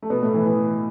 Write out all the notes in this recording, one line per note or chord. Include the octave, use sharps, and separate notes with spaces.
A3
B2 B3
A2 A3
E3
E3